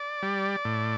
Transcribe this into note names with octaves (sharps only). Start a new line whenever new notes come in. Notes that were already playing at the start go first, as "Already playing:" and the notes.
Already playing: D5
G3
A2